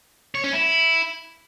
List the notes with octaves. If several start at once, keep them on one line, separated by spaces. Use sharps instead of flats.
C#5
C#4
E4